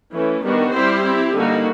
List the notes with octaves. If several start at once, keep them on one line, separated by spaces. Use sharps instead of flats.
E3 A3 C#4
D#3 G3 B3 D4 F#4
G3 C4 E4 G4 C5
C4 E4 G4
D3 G3 A#3 D#4 F#4